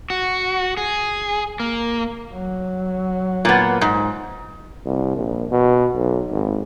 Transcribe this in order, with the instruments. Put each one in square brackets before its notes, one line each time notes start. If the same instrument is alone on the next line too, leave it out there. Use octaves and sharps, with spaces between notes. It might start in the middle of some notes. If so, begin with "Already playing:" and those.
[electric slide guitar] F#4
G#4
A#3
[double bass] F#3
[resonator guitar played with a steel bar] A#2 B3
G#2
[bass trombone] C2
A#1
B2
B1
G#1